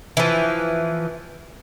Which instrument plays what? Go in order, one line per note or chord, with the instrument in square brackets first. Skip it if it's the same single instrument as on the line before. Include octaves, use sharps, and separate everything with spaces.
[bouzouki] E3 F3